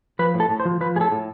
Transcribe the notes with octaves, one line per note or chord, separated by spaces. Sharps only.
F3 B4
A2
A4
A2
C5
F3
F3 B4
A2 G#4
A4
A2